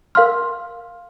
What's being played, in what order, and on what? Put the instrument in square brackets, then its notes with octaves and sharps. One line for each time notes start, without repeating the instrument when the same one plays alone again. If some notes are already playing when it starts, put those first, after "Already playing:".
[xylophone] A#4 F5 C6 F6